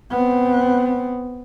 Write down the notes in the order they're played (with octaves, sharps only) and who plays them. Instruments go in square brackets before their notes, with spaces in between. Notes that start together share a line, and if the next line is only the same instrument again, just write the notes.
[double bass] B3 C4